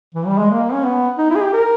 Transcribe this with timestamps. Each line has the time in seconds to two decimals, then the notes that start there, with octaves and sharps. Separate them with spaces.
0.15 E3
0.27 G3
0.38 G#3
0.50 A#3
0.73 C#4
0.84 B3
1.18 D#4
1.30 E4
1.35 G#4
1.41 G4
1.53 A#4